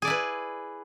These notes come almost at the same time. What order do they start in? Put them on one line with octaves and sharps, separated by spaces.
G#4 D5 E4 B4